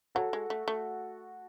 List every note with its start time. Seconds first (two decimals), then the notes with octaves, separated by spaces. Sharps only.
0.15 F#3 F#4 A4
0.33 G#3
0.50 A3
0.68 A3